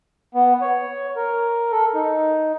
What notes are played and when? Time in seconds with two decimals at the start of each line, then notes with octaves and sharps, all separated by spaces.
0.35 B3
0.62 C#5
1.16 A#4
1.72 A4
1.94 D#4